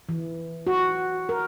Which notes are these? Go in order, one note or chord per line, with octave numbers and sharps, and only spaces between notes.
E3
F#4
A#4